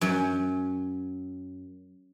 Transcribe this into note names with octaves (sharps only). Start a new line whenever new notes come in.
F#2 F#3 C#4